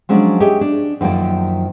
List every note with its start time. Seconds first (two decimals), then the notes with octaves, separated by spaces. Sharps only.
0.09 F3 F#3 G#3 C#4 D4
0.40 G4 G#4 C#5 D#5 E5 G5
0.61 D4
1.01 F#2 D#3 F3 A#3 D5